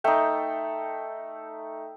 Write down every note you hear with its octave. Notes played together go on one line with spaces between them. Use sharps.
A3 D#4 G5